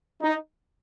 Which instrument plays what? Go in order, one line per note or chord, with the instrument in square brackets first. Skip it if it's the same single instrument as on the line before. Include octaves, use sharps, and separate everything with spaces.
[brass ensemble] D#4